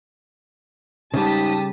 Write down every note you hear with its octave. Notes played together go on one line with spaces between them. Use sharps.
G#2 C#3 G3 G4 A5 D#6 B6